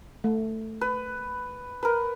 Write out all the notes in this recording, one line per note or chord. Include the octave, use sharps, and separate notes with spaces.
A3
B4
A#4 B4